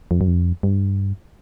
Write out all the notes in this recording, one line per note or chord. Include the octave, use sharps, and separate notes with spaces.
F2
F#2
F2
G2